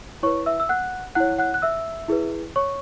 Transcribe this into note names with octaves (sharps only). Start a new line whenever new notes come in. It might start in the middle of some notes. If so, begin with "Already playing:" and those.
E4 B4 C#5 C#6
E5 E6
E6
F#5 F#6
E4 C#5 F#5 F#6
F#5 F#6
F#6
E5 E6
E4 G#4 B4
C#5 C#6